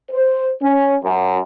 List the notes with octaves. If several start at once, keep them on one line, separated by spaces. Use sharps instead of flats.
C5
C#4
F#2